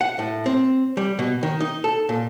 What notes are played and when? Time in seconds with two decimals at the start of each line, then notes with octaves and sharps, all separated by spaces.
0.01 F#5
0.19 A2
0.46 C4
0.97 G3
1.19 B2
1.43 D#3
1.60 D#4
1.84 A4
2.09 A#2